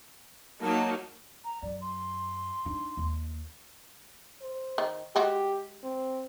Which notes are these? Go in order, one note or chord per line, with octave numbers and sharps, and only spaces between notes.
F#3 A#3 D#4 A5
A#5
F#2 D5
C6
D4 D#4
D#2
C5
D#3
G#3 F#4 G4 G5
C4